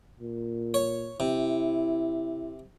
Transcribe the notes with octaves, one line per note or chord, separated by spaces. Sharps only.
A#2
C#5
C3 E4